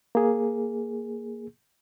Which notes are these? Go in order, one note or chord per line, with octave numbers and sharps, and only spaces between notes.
A#3 G#4